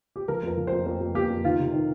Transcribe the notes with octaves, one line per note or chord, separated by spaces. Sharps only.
G4
F3 A#4
F2 A#4
F3
C5
F2
F2 C5
F2
A#3 G4
F2
D#3 F4
C3
D#3